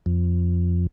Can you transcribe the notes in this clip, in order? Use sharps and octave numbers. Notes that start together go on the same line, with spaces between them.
F2